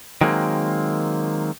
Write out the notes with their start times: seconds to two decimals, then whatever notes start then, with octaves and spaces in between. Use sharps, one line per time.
0.21 D#3 F#3 G#3 A#3 C4